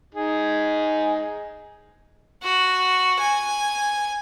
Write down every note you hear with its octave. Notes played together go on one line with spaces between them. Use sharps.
D#4 G#4
F#4
G#5